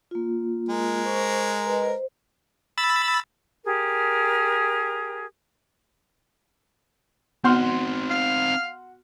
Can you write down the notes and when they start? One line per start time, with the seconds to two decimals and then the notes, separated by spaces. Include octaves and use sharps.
0.11 A#3 F4
0.69 G#3 A#4
1.05 C5 C#6
1.67 B4 D#5
1.87 C5
2.78 B5 E6 A6
3.65 G4 G#4 A#4
7.44 B3 C4 D#4 F#4 C6 F6
8.10 F5